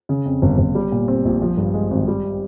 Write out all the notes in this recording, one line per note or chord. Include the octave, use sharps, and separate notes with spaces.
C#3
F2
G1
G1
G3
A#2
C4
A#1
F3
G2
G#3
G#1
G3